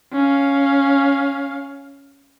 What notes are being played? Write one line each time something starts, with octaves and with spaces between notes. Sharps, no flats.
C#4 F5